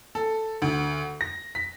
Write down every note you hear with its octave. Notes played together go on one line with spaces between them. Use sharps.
A4
D2
A#6
B6